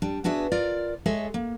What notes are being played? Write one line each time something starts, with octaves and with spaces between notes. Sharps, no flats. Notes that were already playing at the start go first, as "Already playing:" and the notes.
G3 D4
B3 D4 F#4 G#4 E5
F4 A#4 D5
G#3 G#4 A4 C#5 D#5 E5
A#3